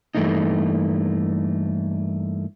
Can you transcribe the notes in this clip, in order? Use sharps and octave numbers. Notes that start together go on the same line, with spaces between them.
G2 A#2 E3 A3 A#3 D#4